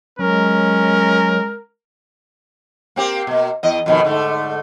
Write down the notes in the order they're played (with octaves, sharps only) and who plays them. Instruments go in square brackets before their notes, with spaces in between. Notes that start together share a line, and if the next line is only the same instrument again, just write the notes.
[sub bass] F#3 [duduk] G#3 [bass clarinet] C#4 [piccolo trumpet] A#4
[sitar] A#3 C4 G4
B2 A#3
E2 D#5
F2 B2 D#3
G#2 D3 A3